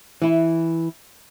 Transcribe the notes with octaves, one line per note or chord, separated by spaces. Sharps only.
E3 E4